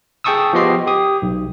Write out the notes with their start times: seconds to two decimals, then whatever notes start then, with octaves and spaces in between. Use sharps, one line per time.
0.24 G#4 G5 A5 C#6 D#6 E6
0.53 F3 B3 G4 D#5 C6 C7
0.87 G4 D#6
1.22 B1